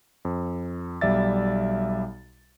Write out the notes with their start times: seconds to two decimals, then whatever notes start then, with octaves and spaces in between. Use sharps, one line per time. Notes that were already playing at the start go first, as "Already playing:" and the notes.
0.25 F2
1.01 B1 G3 D5 E5 A6